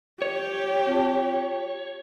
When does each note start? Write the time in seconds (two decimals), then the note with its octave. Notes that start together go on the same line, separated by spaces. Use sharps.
0.22 G4 C#5
0.87 C4 F4 A5